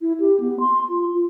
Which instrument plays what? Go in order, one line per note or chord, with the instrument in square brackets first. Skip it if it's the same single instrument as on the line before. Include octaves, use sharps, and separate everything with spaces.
[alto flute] E4
G4
B3
C6
F4
F4